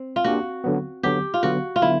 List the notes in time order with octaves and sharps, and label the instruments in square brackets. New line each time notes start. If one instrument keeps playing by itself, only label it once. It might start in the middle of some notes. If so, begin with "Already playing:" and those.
Already playing: [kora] C4
F4
[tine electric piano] A#3 D4 G4 [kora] F#4
[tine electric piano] D3 F#3 B3
[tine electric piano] D3 F#3 B3 [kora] G4
[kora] F4
[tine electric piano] D3 F#3 B3 [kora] F#4
[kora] F4
[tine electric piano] D3 F#3 B3 [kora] E4